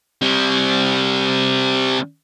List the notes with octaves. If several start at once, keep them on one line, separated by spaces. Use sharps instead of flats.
G3 C4